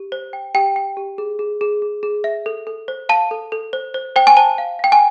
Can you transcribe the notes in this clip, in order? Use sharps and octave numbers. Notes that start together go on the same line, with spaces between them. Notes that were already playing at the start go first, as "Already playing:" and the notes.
Already playing: G4
C5
G5
G4 G5
G5
G4
G#4
G#4
G#4
G#4
G#4
E5
A4
A4
C5
F5 A5
A4
A4
C5
C5
C5 G5
G#5
C5 A5
F5
F5 G5
G#5